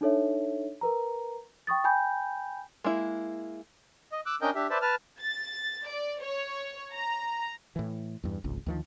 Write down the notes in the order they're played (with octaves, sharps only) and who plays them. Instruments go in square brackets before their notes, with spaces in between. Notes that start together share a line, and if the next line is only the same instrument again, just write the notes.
[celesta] D4 D#4 A4 C#5 E5
A#4 B4 A#5
G5 C#6 D#6 A6
G5 G#5 B5 G6
[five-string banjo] G#3 A#3 E4
[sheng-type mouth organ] D#5
D6 E6 F#6
C#4 D4 A#4 D#5 G5 G6
D4 G4 E5
B4 C5 D5 E5 A5
B4 A5 F6
[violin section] A6
D5
C#5
A#5
[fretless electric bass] A2 E3
E2 G2
D1 G#1 C#2
D2 D#3 F3